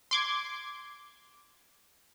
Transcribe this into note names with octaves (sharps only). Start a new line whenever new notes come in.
C6 D6 G#6